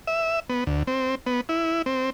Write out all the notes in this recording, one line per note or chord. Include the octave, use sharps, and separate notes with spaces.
E5
B3
D2
C4
B3
E4
C4